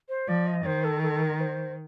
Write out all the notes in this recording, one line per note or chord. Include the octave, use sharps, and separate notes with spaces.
C5
F3 D5
D#5
D#3 C5
A4
A4
A#4
C5